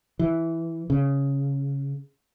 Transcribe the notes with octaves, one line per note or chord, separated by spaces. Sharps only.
E3
C#3